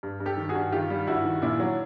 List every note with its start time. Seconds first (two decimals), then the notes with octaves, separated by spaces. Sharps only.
0.03 G2
0.20 G2
0.26 G4 A4
0.37 D#3
0.49 F#4 G#4
0.55 G2
0.72 D#3 F4 G4
0.90 G3
1.07 G2 E4 F#4
1.25 D#3
1.42 A#2 D4 E4
1.59 F#3